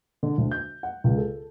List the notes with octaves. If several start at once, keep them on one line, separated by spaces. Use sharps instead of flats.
D3
D2
G6
F#5
C#2
A4